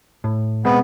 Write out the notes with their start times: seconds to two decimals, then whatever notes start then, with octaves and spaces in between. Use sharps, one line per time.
0.24 A2
0.65 B2 G#3 B3 C4